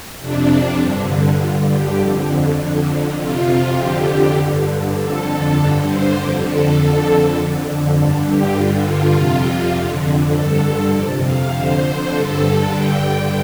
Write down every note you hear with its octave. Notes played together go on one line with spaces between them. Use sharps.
F2 C3 D4
G2 D3
G2 D3 F4
G4
F2 D3
F2 D3
F2 C3 F4
F2 D3 G4
G2 D3
F2 D3 A4
G2 D3 A4
C5
F2 D3 G4
A4
F2 D3 A4
F2 D3
G2 D3 A4
G4
G2 D3 F4
F4
F2 C3
F2 D3
G2 D3 A4
F2 C3 D5
F5
F2 D3 C5
G2 D3 A4
G2 D3 G5